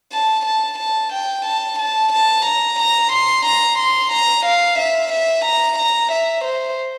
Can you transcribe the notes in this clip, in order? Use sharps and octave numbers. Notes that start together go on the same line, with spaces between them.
A5
A5
A5
G5
A5
A5
A5
A#5
A#5
C6
A#5
C6
A#5
F5
E5
E5
A#5
A#5
E5
C5